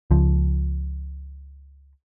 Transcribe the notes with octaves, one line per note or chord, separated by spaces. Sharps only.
C#2 F3